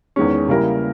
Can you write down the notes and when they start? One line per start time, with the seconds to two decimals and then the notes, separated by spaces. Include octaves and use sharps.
0.16 E2 D#3 G#3 C#4
0.48 C#3 G3 A#3 E4 A#4